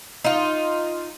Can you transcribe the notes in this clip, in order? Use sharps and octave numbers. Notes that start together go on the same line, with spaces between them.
D#4 F4